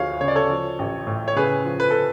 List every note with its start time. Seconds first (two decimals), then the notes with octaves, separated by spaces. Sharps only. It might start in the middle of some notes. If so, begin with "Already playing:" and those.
Already playing: D2 F3 G#4 C#5 F5
0.21 C#3 C#5
0.28 D5
0.36 A4 C#5
0.50 F3
0.79 A1
1.07 A2
1.28 C#5
1.36 C#3 G#4 B4
1.65 F3
1.80 B4
1.91 A4